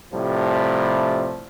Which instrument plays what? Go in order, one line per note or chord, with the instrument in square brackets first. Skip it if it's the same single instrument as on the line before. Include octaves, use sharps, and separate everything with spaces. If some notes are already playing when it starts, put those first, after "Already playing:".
[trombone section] A2 C3 F3 G3